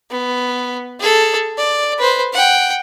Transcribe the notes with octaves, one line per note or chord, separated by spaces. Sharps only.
B3
G#4 A4
D5
B4 C5
F#5 G5